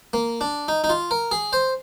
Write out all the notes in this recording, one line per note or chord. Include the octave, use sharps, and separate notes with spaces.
A#3
D4
D#4
D#4
F4
A#4
G#4
C5